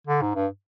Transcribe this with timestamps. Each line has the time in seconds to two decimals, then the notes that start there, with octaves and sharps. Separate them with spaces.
0.07 D3
0.22 G#2
0.35 G2